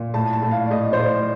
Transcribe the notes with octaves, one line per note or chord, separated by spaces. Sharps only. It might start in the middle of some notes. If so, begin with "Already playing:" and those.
Already playing: A#2
A2 A5
A5
A2
F5
D5
A2 D#5
C5
A2 D5